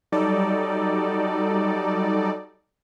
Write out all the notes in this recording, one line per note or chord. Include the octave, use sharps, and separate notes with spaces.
F#3 G3 D#4 A4 D5